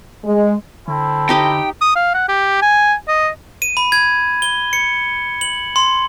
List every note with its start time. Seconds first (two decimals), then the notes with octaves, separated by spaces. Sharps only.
0.25 G#3
0.88 D3 C4 E4 A4
1.29 D#4 G4 D#5 G5
1.81 D#6
1.96 F5
2.14 F#5
2.28 G4
2.62 G#5
3.08 D#5
3.62 D#7
3.77 B5
3.92 G#6
4.42 G7
4.73 C#7
5.41 F#7
5.76 C6